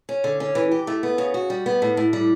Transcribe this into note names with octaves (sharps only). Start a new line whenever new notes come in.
C#4
D3
C#4
E3
G4
A3
B3
C#3
F#4
G3
B3
A2
A2
G3